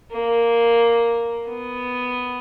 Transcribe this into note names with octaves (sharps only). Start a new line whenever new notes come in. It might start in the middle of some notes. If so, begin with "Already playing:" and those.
A#3
B3